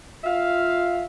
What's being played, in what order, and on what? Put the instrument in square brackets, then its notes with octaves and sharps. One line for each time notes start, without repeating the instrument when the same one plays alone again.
[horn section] F4 E5 F5